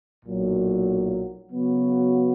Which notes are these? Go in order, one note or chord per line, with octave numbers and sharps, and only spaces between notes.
B1 A#2 F#3
C#3 F#3 B3 F#4